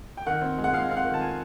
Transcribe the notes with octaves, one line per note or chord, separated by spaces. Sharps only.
G5
D#3 F#5
C4
G#3
F#5
G#3 F5
C4 F5
F#5
D#3
A5
G#5